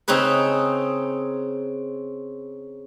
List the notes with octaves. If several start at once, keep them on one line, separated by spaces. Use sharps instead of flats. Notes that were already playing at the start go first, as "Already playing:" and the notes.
C#3 C4 C#4 D#4 G#4 B4